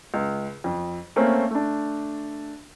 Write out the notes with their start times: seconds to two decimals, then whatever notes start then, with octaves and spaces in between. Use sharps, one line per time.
0.14 C#2
0.64 F2
1.16 A3 A#3 C4 C#4
1.51 A3 D4